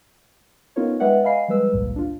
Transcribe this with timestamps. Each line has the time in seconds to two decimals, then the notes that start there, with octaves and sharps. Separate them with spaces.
0.76 B3 C#4 D#4 F4 A#4 C#5
1.00 G#3 B4 D5 E5 F#5 G5
1.23 D#5 F5 G#5 B5 C7
1.48 F3 G3 G#3 B4 E6
1.73 G#1 C#2 G2 A#2
1.96 D4 F4